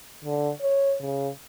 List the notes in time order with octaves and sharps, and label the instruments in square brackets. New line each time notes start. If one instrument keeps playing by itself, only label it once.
[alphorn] D3
C#5
C#3